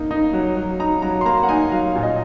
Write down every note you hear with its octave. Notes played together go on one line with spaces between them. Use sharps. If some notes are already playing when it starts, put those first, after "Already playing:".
Already playing: A#3 D#4
D#4
F#3
F#3
D#4 A#5
F#3 A#5
C6
A#3 A#5
F#5
D#4 G#5
F#3 F5
A#2 F5
D#5